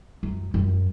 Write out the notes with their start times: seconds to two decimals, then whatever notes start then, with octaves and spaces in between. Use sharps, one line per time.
0.23 F#2
0.54 F#2